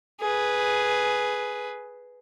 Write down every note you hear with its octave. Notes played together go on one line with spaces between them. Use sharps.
G#4 B4